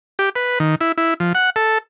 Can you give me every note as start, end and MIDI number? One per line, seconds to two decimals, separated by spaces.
0.19 0.29 67
0.36 0.59 71
0.60 0.75 51
0.81 0.92 64
0.98 1.14 64
1.20 1.33 53
1.35 1.50 78
1.56 1.78 69